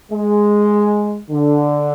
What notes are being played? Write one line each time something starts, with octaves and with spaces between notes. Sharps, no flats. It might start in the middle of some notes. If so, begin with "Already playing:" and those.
G#3
D3